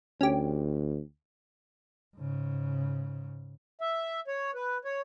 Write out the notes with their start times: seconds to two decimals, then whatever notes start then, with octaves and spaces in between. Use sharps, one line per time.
0.21 D2 C#4 G4
2.16 G#2 C#3
3.81 E5
4.28 C#5
4.55 B4
4.85 C#5